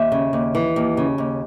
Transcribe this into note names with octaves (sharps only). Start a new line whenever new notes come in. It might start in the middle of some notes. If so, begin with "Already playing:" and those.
Already playing: D#2 E5
C#3
D#2
E3
D#2
C#3
D#2